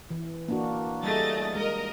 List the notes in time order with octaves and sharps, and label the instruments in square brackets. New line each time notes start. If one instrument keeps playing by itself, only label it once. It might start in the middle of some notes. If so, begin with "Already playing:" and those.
[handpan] E3
A#3 D4 F#4
[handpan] G3 G#4 [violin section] A3 D#5 A6
[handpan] G#3 [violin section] A#4 D#5